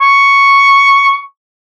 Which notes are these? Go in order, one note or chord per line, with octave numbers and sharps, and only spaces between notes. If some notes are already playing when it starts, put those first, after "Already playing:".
C#6